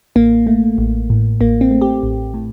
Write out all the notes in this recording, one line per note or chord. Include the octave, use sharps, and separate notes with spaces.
A1 A#3
A3
A1
A2
A1 A#3
C4
A3
G4
A1
A2